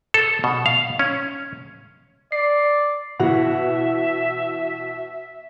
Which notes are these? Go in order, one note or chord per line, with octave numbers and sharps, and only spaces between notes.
A4
B2
F5
C#4
D5 C7
B2 E3 F#4 E5